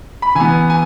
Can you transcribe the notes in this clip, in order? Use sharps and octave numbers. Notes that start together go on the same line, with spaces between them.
B5
E3 G#5
B3
G#5